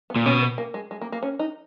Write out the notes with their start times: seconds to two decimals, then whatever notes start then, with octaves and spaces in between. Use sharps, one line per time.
0.10 B3
0.16 A#2
0.26 B2 C#4
0.42 B3
0.58 A#3
0.74 G#3
0.91 G#3
1.01 A#3
1.12 A#3
1.23 C#4
1.39 D#4